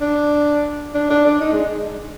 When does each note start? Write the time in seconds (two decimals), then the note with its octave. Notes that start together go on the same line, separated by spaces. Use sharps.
0.01 D4
0.95 D4
1.10 D4
1.25 D4
1.41 D#4
1.53 G#3